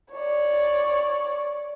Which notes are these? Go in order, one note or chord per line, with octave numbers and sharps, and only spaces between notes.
C#5 D5